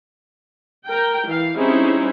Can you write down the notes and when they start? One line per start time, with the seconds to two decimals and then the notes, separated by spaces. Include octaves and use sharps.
0.86 A#4 G5
1.27 E3 F5
1.57 G3 C4 C#4 D#4 E4 G#4